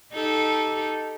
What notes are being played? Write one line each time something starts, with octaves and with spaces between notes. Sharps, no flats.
D#4 G4 A4